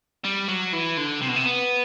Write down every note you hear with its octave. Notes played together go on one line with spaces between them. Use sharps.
G3
F#3
E3
D3
C3
B2
C3
B3